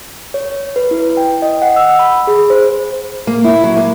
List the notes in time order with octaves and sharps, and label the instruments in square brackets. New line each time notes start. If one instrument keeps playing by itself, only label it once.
[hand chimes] C#5
B4
E4
G5
D#5
F#5
E6
B5
G#4
C5
[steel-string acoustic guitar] A#3
E4
F#3
A#3